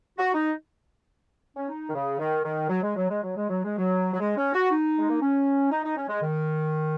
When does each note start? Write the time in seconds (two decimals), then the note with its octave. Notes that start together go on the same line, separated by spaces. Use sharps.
0.18 F#4
0.34 D#4
1.56 C#4
1.69 D#4
1.88 D#3
1.94 C#3
2.19 D#3
2.44 D#3
2.69 F#3
2.82 G#3
2.96 F#3
3.10 G#3
3.23 F#3
3.37 G#3
3.50 F#3
3.64 G#3
3.78 F#3
4.13 F#3
4.20 G#3
4.37 C#4
4.53 F#4
4.70 D#4
4.99 G#3
5.10 A#3
5.21 C#4
5.71 D#4
5.84 D#4
5.97 C#4
6.09 G#3
6.21 D#3